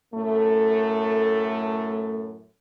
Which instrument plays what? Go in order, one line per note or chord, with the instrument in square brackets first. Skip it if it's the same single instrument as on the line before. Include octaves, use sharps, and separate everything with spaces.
[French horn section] F#2 A2 A3